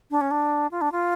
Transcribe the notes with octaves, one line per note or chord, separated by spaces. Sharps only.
D4
C#4
D4
F4
D4
F4